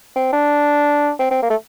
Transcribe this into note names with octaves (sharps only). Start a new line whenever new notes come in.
C4
D4
C4
C4
A#3
A3